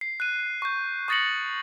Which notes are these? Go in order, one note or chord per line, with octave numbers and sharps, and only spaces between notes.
C7
F#6 D#7
C#6 G6
C#6 D#6 A6 A#6 C#7 F#7